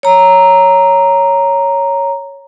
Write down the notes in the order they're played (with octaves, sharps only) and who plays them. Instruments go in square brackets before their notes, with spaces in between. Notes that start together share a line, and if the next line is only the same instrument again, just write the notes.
[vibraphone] C#5 A#5